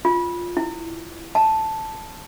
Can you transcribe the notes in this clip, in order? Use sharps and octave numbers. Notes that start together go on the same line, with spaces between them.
F4
E4
A5